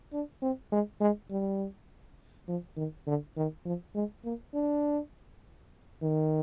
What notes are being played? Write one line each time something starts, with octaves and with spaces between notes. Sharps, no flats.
D4
C4
G#3
G#3
G3
F3
D#3
D3
D#3
F3
G#3
A#3
D4
D#3